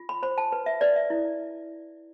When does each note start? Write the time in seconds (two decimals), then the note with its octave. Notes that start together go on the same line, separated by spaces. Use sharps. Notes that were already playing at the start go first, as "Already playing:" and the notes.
Already playing: F4
0.09 B5
0.23 C5 B5
0.38 A5
0.52 B4
0.66 E5
0.81 B4 D5
0.96 E5
1.10 E4